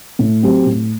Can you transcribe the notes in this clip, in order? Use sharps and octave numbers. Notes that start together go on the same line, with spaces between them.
A2
F#3 C4 G4
A2